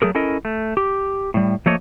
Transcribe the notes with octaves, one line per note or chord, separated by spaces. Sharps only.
F#3 A3 G#4 A#4
C#4 E4 A4 A#4 D#5
A3
G4
A2 G3
F3 A3 A#3 A4 C#5 D#5